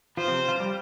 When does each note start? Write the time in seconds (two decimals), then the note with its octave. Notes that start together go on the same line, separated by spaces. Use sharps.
0.17 F3 F4 C5
0.27 C3 C4
0.48 F3 F4
0.59 G3 G4